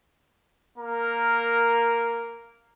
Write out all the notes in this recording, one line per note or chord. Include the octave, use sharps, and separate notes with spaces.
A#3 A#4